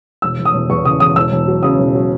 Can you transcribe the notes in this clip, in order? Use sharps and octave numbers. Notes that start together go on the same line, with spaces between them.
E1 E6
E1
D#6
E1
E2 C#6
C#3 D#6
E1 D#6
E1 E6
E1
F#3
C#3 D#6
E1
F#3